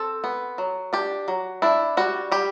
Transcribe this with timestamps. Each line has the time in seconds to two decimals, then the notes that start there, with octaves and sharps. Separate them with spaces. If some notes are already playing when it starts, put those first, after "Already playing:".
Already playing: C4 A4
0.24 B3
0.58 F#3
0.93 D4 G4
1.28 F#3
1.62 D4 E4
1.97 G3 F#4
2.31 G3 G4